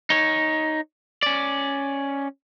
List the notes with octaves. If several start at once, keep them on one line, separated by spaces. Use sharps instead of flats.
D#4 C#5
C#4 D5